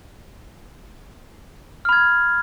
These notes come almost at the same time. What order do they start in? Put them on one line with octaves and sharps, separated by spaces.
F6 B5 G#6